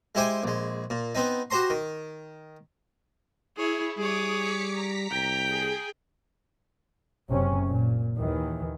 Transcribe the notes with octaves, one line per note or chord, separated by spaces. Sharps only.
G#3 E4 G4 C5 G5 G#5
A#1 G#3
A#2
B3 C4 D#4
F#4 G4 C5 A#5 C6
D#3
E4 G#4 C#5
G3 G#4 C#5 D6 D#6
D6 B6 C#7
A#5 B6
C2 G5
G#4
F#1 C3 C#4
A#2
D#2 D#3 E3